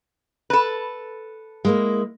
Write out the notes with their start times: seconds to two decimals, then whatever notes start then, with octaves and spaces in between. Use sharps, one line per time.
0.50 A4 B4
1.65 G#3 A#3 E4